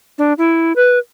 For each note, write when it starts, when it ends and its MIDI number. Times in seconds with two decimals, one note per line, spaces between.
0.18 0.33 62
0.38 0.73 64
0.76 0.99 71